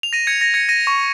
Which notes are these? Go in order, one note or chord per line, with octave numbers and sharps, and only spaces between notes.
F7
A#6 D#7
G#6 C#7
A#6
G#6 C#7
A#6 D#7
C#6